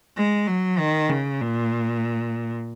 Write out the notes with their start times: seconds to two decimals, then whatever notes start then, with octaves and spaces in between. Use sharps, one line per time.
0.17 G#3
0.47 F#3
0.79 D#3
1.09 C#3
1.40 A#2